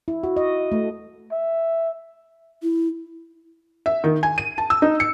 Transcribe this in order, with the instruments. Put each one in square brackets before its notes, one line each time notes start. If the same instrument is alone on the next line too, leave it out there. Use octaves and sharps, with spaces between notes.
[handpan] E4
F#4
D#5
A3
[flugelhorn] E5
[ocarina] E4
[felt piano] E5
D#3
G#5
D#7
A5
E6
D#4
C#7